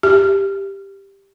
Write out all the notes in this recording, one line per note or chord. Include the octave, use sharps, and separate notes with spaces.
G4